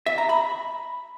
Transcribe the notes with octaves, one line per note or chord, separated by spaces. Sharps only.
E5
A#5
B5